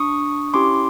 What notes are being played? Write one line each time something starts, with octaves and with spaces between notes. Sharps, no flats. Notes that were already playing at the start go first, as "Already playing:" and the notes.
Already playing: D4 C#6 D#6
C#4 E4 G4 C6 D6